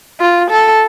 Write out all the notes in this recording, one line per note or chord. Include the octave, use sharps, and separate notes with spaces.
F4
A4